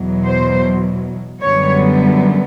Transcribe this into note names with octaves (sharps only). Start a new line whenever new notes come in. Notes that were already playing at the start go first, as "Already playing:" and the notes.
Already playing: E2 B2 F#3
C5
F#2 D3 G3 B3 C#5